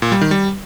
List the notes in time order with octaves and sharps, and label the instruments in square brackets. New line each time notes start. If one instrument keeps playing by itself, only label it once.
[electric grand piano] A#2
G3
D#3
G3